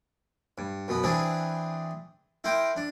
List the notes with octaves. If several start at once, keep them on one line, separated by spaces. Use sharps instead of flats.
G2
F#2 B2 B3
E3 C4 D4 G#4 B4
E4 A#4 G5 C6 D6
D4